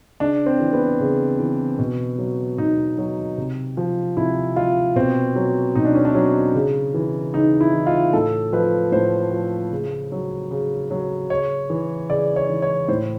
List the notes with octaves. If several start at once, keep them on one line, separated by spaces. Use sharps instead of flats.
C#3 D4
C4
E3
B3
C#3
E3
B2
F#3
B2 D#4
F#3
C3
F3
C3 E4
F3 F4
B2 C4
F#3
B2 D#4
D4
C#4
D4
F#3
C#3
E3
C#3 D#4
E4
E3
F4
A2 A4
F3 B4
A2 C5
F3
C#3
F#3
C#3
F#3
C#3 C#5
E3
C#3 D5
C#5
E3
C#5
A2 C5